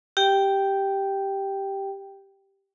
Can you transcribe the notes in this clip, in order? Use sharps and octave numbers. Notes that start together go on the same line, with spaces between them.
G4 G5